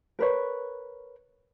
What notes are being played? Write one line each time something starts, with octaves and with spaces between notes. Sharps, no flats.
A#4 B4 C#5